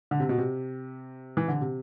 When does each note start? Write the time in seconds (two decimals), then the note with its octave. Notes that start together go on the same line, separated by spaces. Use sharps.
0.11 D3
0.20 C3
0.29 B2
0.38 C3
1.37 E3
1.48 D3
1.61 C3